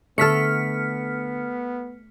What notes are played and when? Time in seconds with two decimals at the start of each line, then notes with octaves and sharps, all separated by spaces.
0.18 D3 A3 B3 A4 F6 B6 C#7